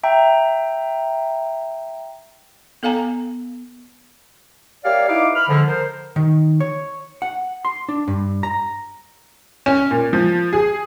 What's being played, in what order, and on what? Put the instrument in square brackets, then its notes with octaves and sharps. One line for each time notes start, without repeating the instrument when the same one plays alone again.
[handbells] E5 G5 A#5
[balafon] B3 A4 F5 G#5 A#5
[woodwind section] A#3 G4 C#5 D5 E5 F5
D#4 E4 B4 F5 D6
B5 F6
G#2 D3 F3
A#4 C5
[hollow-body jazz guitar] D#3
C#5
F#5
C6
D4
G2
A#5
[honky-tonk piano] C#4
A#2
F3
G#4